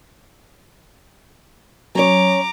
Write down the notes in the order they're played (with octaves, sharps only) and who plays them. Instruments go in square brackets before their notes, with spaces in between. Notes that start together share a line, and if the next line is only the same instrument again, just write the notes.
[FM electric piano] F#3 [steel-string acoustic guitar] C#4 C#5 [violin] A#5 D6